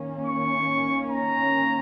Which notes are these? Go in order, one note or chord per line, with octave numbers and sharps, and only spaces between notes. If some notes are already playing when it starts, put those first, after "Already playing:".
Already playing: D#3 A#3 C#4
C#6
A#5